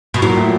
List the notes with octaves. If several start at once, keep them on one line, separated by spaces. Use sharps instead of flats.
B2
A#2 F#3
A2